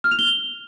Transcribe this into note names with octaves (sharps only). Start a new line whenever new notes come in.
F6
F7
G7